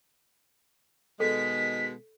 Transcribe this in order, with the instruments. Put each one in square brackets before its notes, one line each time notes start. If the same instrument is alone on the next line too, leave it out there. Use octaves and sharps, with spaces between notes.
[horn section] B2 D#3 G#3 [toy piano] A4 [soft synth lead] B6